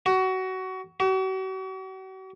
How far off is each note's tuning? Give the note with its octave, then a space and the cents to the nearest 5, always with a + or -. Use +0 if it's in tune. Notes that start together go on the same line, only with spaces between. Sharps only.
F#4 +20
F#4 +40